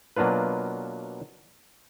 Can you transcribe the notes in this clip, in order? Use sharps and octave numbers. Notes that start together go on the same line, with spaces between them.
B2 F#3 A#3 D4 F4 B4